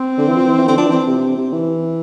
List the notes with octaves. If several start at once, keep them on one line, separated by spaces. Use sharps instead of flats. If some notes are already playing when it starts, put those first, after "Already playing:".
Already playing: C4
D3
E3
F3
E3
E3
D3 C4
F3 D4
E3 C4
C3
C3
E3